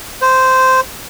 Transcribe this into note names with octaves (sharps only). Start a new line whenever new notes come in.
C5